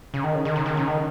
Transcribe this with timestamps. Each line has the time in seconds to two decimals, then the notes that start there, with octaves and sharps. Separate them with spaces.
0.14 C#3
0.24 D#3
0.35 C#3
0.45 D#3
0.56 C#3
0.66 D#3
0.77 C#3
0.87 D#3